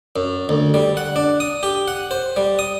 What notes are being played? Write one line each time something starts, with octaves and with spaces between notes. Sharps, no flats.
F#2
D2
G3
F#5
D4
D#6
G4
F#5
C5
G3
D#6